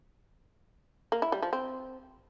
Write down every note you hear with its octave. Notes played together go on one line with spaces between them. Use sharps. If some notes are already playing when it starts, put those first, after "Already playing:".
A#3
E4
G3
F3
C4